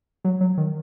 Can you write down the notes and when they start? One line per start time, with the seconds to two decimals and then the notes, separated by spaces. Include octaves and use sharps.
0.24 F#3
0.41 F#3
0.58 D#3